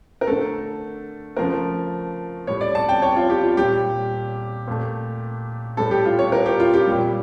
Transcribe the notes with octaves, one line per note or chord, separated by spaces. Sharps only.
A#4
D3 A3 A4
C#3 F3 A3 A#4
A2 G3 C#5
D5
A5
G5
C#5
F4
G4
F4
A#2 G3 G4
A#2 A3
A2 G3 A4
G4
F4
C#5
A#4
G4
F4
G4
A#2 G3